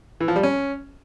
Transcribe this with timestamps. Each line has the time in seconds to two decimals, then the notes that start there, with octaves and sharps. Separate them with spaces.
0.21 E3
0.28 F3
0.36 G3
0.43 C#4